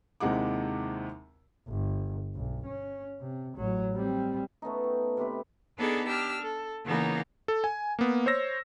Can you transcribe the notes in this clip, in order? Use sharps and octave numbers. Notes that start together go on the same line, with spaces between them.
D#2 C3 G#3 E4 F#5 D6
G1
B1
C#4
C3
A1 F#3
G3 C4
A3 B3 C#4 D#4
G5
C3 C4 G4 B4
B3 D4 D#4 G#4 A4 D5
D4 G4 E6 F6
A4
C#3 E3 A#3 B3 D#4
A4
G#5
A#3 B3
C5 C#5 E6 A#6